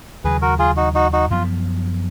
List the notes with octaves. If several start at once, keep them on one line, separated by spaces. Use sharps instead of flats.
D#2 C#3 F#3 G#4 B4
F#4 A#4
F4 G#4
D#4 F#4
D#4 F#4
D#4 F#4
F#2 F3 B3 F4